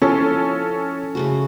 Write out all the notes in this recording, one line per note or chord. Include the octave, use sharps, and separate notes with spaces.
F3 C#4 E4 F4 A4
C#3 A3 F#4